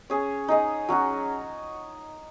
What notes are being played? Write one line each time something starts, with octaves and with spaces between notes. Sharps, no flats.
C#4 G#4 C#5
D#4 G#4 D#5
F#3 C#4 F#4